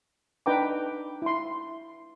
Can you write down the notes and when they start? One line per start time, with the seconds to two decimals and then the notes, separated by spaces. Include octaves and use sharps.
0.46 D4 D#4 B4 G5 A#5 D6
1.22 E4 C6